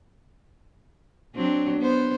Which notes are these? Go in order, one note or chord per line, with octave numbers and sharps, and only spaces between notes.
F#3 C4 D4
B3 C5